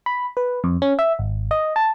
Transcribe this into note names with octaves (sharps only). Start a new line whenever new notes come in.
B5
B4
F2
C#4
E5
G#1
D#5
A5